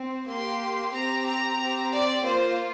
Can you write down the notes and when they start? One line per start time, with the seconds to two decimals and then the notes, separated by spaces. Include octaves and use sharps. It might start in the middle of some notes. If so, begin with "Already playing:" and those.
Already playing: C4
0.28 A#3 G4 C6
0.93 C4 A#5
0.99 G4
1.27 A#5
1.59 C4 G4
1.91 D5
2.24 A#3 F4 C5